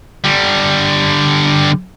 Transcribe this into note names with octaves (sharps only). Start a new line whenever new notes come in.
D3 G3